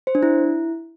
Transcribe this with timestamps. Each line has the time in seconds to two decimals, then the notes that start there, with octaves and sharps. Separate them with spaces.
0.07 C5
0.15 D4
0.23 E4